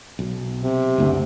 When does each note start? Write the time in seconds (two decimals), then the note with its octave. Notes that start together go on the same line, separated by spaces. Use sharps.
0.19 B1
0.60 C3
0.98 F#1 D2